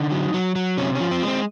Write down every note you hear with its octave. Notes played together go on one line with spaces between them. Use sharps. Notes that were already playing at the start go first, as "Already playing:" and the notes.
Already playing: D3 D#4
F#3
F#3
F#3
C3 C#4
C#4
F3
C4
G#3 C4